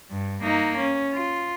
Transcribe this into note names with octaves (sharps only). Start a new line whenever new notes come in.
G2
A#3 D#4
C#4
F4